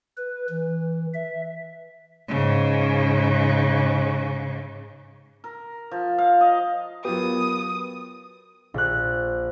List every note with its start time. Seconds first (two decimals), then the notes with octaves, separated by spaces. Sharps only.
0.18 B4
0.50 E3
1.14 E5
2.28 G#2 C#3
5.44 A#4
5.91 F3
6.18 F5
6.41 D#5
7.05 F#3 B3 F4 G4 A#4 B4 D#6
8.74 A#1 F#6